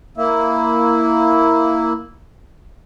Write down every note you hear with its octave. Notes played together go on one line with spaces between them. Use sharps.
A#3 E4